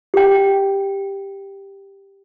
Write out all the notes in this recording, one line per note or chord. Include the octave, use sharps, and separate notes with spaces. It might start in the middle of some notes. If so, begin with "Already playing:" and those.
G4 G5